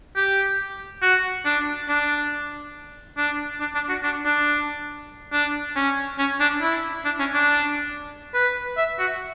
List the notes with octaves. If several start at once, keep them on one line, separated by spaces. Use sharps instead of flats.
G4
F#4
D4
D4
D4
D4
D4
F#4
D4
D4
D4
C#4
C#4
D4
E4
D4
C#4
D4
B4
E5
F#4